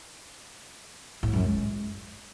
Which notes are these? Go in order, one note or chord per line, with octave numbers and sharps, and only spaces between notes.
A2
F#2
G#3